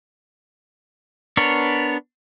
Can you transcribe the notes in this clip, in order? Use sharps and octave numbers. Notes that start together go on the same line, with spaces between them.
B3 D4 A#4 C#5